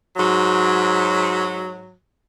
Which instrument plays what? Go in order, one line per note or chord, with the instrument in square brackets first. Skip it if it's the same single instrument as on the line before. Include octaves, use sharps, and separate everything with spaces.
[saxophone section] G#2 F#3